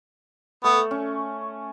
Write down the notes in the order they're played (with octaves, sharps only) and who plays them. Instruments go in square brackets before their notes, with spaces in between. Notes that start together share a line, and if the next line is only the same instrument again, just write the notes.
[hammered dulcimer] A3 [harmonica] B3
[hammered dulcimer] C#4